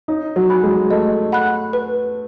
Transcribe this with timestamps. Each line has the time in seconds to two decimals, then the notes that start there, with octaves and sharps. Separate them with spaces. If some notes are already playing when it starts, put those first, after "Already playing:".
0.08 D#4 C#5
0.36 F#3
0.49 G#5 B5 F#6
0.63 G#3
0.91 A3 D#5
1.32 F#5 B5 F#6
1.73 B4